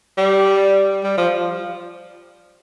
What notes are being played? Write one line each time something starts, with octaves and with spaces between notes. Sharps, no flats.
G3
G3
F3